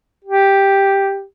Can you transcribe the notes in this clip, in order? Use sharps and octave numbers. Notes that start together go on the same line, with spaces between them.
G4